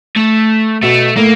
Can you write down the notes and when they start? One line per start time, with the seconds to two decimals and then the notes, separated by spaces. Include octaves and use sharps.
0.16 A3
0.83 B2 A3
1.16 A2 A#3